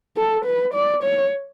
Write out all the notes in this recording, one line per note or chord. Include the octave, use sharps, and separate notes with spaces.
A4
B4
D5
C#5